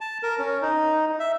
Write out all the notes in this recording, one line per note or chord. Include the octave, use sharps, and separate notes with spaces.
A5
A#4
C#4
D#4
E5